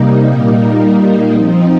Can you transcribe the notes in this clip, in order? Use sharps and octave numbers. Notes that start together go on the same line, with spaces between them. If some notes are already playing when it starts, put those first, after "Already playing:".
Already playing: C3 G3 A#3 D#4
A#2 G3 A#3 D#4
F3 C4 D#4